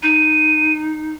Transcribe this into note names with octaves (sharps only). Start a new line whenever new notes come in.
D#4 D#7